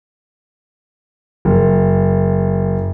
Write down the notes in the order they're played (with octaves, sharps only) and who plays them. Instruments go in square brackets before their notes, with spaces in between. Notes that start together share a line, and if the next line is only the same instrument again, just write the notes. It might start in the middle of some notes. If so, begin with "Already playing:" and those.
[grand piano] F#1